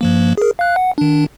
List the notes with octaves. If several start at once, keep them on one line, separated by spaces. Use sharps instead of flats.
G2 F3 A#3
G#4 A#4
F5 F#6
F#5
D#3 D4